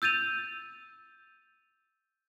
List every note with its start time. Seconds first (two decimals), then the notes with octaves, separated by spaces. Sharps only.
0.02 E6 G6 A6 D#7 F7